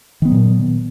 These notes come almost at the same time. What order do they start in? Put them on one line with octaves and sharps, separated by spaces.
D#3 B3 F#3 A#2